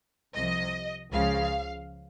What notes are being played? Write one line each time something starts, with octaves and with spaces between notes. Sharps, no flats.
C2 C3 F3 D#5
C#2 C#3 F3 F5